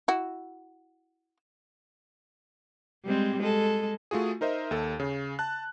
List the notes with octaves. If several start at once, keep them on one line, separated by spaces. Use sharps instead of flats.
E4 F#4
G3 G#3 C4
G#3 A4
A3 F4 F#4 G#4
D#4 A#4 C5 D#5 E5
D#2 A4
C#3
A5 F#6